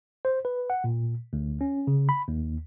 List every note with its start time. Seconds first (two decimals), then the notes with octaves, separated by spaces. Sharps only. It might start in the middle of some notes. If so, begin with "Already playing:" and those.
0.25 C5
0.45 B4
0.70 F#5
0.84 A#2
1.33 D2
1.61 C#4
1.87 C#3
2.09 B5
2.28 D#2